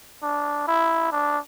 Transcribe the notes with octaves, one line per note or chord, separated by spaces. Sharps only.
D4
E4
D4